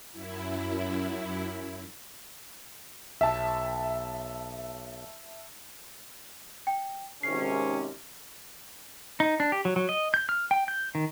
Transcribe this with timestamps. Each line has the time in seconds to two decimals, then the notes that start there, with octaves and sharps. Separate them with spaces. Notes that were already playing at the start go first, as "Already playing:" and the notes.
0.12 F#2 E4
3.21 B1 E5 A5
6.67 G5
7.23 G#1 C3 C#4 C7
9.20 D#4
9.40 D4
9.52 G4
9.65 F#3
9.76 F#3
9.89 D#5
10.14 G6
10.29 F6
10.51 G5
10.68 G6
10.95 D#3